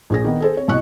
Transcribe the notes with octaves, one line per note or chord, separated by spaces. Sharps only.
A#1 G#4 A#6
D#3 B3
G#4 A4 C5
C4 C#5
C2 B2 D#5 C#6 F#6